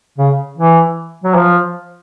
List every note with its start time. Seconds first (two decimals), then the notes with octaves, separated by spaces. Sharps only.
0.18 C#3
0.57 E3
1.24 F#3
1.35 F3